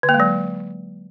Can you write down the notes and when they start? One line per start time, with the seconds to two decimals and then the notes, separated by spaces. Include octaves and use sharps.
0.03 D3
0.09 A#3
0.14 G#3
0.20 F#3